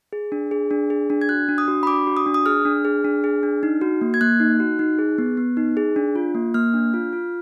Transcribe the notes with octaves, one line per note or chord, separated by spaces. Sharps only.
G#4
D4
G#4
D4
G#4
D4
G#6
F#4 F#6
D4
D#6
F#4
B5
D4 D6
F#4
D#6
D4
D#6
G#4 F6
D4
G#4
D4
G#4
D4
D#4
F#4
A#3
G#6
A#3 F#6
D#4
F#4
D#4
G#4
B3
B3
D#4
G#4
D4
F4
A#3
A#3 F6
D4
F4
F4